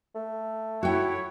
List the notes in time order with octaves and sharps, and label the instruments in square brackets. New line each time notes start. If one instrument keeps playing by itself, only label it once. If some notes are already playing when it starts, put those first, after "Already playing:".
[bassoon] A3
[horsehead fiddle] E4 C#5 [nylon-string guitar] F#4 G5